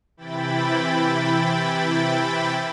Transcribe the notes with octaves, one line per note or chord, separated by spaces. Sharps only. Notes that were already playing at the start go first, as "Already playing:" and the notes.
C3 E3 E4 G5 B5 A6